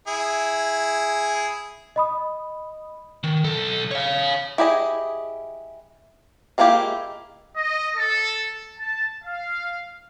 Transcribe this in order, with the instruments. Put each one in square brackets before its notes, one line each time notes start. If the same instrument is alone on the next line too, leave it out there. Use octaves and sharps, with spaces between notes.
[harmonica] E4 G#4
[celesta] D#5 B5 D#6
[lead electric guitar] D#3
B1 A4
C#5 F5
[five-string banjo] E4 G4 G#4 D#5
G#3 A#3 E4 F4 G4
[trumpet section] D#5
A4
A5
F5